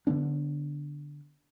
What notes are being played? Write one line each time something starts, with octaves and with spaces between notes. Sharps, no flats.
D3 E3 B3 D4